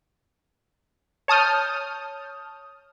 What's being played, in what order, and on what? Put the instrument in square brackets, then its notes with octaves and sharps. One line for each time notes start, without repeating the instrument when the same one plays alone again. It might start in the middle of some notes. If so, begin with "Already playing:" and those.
[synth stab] C#5 A5 D#6 F6 G6